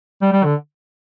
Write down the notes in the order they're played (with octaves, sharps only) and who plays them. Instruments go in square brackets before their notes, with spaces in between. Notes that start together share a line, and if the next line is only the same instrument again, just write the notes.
[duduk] G3
G3
D3